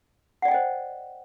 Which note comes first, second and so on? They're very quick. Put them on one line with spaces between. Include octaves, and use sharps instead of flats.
F#5 D5 G5 D#5 C5